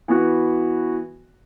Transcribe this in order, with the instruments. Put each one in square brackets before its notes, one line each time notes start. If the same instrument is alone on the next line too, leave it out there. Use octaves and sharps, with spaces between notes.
[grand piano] E3 B3 F#4